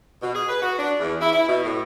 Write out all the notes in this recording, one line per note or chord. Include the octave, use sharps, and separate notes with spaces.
B2
G#4
B4
F#4
D4
E2
E4
E4
B2
A2